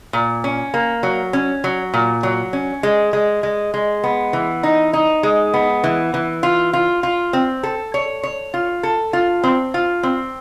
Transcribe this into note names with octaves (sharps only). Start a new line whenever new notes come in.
A#2
C#4
A#3
F#3
C#4
F#3
A#2
F#3
C#4
G#3
G#3
G#3
G#3
B3
E3
D#4
D#4
G#3
B3
E3
E3
F4
F4
F4
C4
A4
C#5
C#5
F4
A4
F4
C4
F4
C4